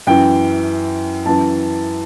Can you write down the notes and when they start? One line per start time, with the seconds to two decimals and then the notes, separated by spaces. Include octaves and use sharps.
0.07 F#2 E3 G5
1.26 F#2 E3 A5